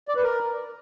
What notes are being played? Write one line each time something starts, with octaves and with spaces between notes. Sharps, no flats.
D5
B4
A#4